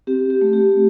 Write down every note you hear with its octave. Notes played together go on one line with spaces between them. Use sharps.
C4 G4
G4
A3
G4